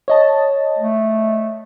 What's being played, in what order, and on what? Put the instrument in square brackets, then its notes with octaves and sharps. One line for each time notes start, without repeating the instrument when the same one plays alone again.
[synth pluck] C#5 D#5 A5
[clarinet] A3